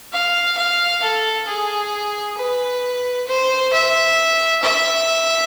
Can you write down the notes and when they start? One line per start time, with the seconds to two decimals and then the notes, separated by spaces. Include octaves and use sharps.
0.13 F5
0.58 F5
1.03 A4
1.48 G#4
2.38 B4
3.27 C5
3.73 E5
4.62 E5